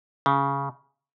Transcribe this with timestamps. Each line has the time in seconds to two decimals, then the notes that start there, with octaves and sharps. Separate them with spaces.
0.26 C#3